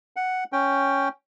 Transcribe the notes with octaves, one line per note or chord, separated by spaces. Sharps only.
F#5
C#4 G5